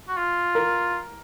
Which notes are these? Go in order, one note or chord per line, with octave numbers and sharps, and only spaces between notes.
F#4
F4
A#4